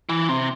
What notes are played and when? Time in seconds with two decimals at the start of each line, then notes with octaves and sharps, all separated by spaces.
0.09 E3
0.29 C3